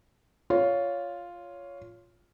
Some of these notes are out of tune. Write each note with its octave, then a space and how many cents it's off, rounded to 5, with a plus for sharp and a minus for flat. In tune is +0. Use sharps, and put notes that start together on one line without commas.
F4 +0 C#5 +15